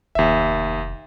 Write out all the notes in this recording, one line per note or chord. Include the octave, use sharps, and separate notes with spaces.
F1 D#2 E5